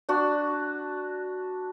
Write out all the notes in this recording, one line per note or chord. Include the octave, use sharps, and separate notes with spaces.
D4 F#4